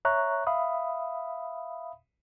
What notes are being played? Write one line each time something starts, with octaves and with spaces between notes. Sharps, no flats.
C#5 E5 A#5 C#6 F#6
E5 F5 B5 D#6